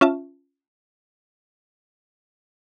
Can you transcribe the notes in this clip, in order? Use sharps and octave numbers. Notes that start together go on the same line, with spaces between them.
C#4 F4 E5 A5